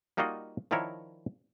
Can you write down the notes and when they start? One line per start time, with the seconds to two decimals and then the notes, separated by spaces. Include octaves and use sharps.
0.17 G3 A#3 D#4 F4 F#4 D#5
0.71 D#3 F3 D4 E4 A#4 C#5